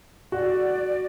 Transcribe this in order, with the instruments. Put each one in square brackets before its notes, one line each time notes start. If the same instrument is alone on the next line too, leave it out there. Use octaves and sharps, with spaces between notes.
[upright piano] F#4 [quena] D5